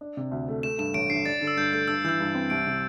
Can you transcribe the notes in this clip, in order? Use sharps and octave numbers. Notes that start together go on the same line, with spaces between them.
D4
C3
D2
A3
A3 E7
G2 E7
A1 D7
D3 C7
D4 A6
D3
E6
G2 G6
A3 G6
G2 E6
E3 E6 G6
G2
C4
C2 D7
C3